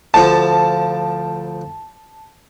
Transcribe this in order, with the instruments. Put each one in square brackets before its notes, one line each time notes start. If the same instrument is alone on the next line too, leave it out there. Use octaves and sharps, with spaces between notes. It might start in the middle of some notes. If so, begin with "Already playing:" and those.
[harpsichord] D2 F3 [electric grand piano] A5